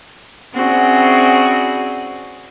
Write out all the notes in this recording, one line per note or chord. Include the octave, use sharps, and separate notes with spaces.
C4 C#4 E4 F#4 G#4 D5